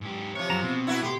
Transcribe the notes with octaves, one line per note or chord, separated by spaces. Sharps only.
G#2 G4
C3 F3 C#5
F#2 F#4 A#5
B2 C4
E4 F#4 B4
A3 G4 C6